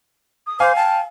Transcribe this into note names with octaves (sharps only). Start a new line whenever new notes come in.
D#6
C5 F5 G#5 D6
G5 A5